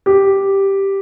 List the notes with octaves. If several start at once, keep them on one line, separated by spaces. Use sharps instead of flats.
G4